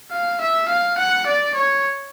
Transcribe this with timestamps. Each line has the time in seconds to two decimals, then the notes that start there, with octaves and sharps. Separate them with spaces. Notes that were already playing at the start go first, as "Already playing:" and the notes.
0.12 F5
0.41 E5
0.69 F5
0.98 F#5
1.26 D5
1.55 C#5